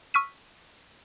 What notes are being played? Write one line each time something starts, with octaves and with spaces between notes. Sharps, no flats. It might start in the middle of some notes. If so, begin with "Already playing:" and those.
C#6 E6 F6 B6 D#7